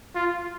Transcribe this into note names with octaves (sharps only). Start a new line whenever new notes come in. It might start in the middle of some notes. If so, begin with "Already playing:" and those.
F4